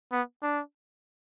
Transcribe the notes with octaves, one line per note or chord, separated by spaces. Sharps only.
B3
D4